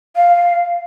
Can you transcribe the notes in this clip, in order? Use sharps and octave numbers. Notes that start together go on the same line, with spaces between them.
F5